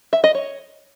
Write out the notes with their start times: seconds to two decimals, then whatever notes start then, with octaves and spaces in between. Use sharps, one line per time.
0.13 E5
0.24 D#5
0.35 C#5